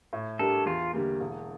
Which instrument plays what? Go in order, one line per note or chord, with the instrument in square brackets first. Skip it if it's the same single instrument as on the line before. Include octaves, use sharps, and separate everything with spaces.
[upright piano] A2
[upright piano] G3 D4 G4 A#4 [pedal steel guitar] A4
[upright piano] E2 [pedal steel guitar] F4
[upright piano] D3 G3 A#3
E1